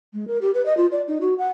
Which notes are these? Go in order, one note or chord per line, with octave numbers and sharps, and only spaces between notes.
G#3
A#4
G4
B4
D#5
F4
D5
D#4
F#4
F#5